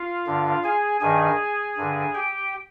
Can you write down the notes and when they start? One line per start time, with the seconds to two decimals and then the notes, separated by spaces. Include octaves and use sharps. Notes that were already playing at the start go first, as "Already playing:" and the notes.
Already playing: F4 F5
0.26 G2 D3
0.64 G#4 G#5
1.01 G2 D#3 G#4 G#5
1.77 G2 D3
2.14 G4 G5